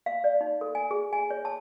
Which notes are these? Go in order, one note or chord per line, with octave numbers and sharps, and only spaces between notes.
F5
D5
D#4
A4
G#5
G#4
G#5
C#5
A5